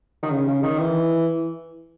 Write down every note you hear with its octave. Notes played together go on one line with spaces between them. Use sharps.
D#3
C#3
C#3
D#3
E3